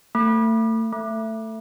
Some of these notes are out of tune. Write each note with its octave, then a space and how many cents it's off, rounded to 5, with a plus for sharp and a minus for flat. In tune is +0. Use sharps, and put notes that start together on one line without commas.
A3 +35
A3 +15